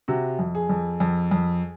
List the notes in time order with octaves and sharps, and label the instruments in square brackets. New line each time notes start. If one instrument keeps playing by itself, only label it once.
[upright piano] C3 F#4
F2
G#4
F2
F2
F2